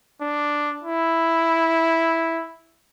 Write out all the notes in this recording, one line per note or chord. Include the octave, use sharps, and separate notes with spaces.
D4
E4